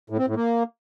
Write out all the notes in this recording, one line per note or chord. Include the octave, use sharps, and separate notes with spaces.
A2
C4
A2
A#3